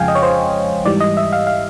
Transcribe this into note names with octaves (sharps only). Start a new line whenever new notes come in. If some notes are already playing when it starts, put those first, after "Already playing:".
Already playing: F2 C#3 F3 G#3 F5 G5 G#5
D#5
C#5
C5
G#2 E3 G3 D5
D#5
E5
F5
F5